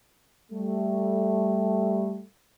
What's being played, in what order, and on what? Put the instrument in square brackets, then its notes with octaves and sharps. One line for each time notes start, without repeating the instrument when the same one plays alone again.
[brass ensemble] G3 A3